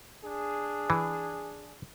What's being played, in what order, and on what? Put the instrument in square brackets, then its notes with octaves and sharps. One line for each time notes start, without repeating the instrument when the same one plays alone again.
[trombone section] D4 G#4
[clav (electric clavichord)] E3